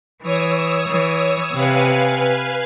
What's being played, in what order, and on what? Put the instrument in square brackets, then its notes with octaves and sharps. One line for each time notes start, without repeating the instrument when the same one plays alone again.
[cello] E3 [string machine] C#5 D#6 E6
[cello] E3
[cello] C3 [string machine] B4 F5 G#5